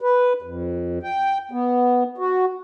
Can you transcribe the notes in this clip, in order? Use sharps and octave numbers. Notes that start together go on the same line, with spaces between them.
B4
F2
G5
B3
F#4